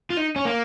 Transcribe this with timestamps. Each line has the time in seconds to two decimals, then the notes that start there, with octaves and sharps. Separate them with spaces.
0.10 F4
0.17 D#4
0.36 C#4
0.45 A#3